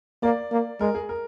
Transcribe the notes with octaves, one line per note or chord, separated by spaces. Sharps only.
A#3 D5
A#3
G#3 A#4
G#4
A#4